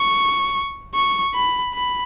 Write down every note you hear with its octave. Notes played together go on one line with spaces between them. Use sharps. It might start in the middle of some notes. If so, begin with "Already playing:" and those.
Already playing: C#6
C#6
B5
B5